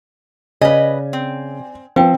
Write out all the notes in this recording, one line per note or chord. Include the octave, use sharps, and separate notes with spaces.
C#3 B4 D5 D#5 G#5
C4
F3 C4 B4 C5 G5